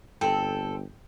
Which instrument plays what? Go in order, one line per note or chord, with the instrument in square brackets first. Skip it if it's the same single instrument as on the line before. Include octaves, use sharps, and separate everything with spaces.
[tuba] G1 [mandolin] C4 A4 [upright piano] G5